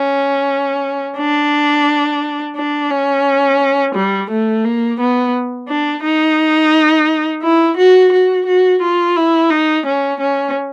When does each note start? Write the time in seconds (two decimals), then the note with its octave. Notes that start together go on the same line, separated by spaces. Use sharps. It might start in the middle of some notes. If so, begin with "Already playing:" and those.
Already playing: C#4
1.17 D4
2.56 D4
2.91 C#4
3.95 G3
4.30 A3
4.65 A#3
5.00 B3
5.69 D4
6.03 D#4
7.43 E4
7.77 F#4
8.12 F#4
8.46 F#4
8.82 F4
9.16 E4
9.50 D#4
9.86 C#4
10.20 C#4